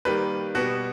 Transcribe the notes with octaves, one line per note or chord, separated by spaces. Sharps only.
D#3 G3 A#3 B4
B2 G3 B3 F#4